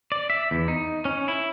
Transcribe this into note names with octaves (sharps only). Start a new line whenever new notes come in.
D5
E5
E2
D#4
C#4
E4